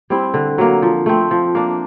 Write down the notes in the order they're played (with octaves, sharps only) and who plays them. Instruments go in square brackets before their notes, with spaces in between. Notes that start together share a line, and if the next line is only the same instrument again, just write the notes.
[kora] G3 C4 E4
D3
F#3 A#3
F3
A3 C4
F3
A#3 D4